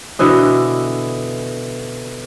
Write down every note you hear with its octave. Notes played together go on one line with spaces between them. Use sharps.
B2 D3 E3 D#5